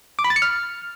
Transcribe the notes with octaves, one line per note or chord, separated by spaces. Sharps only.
D6
B5
A6
C#7
F6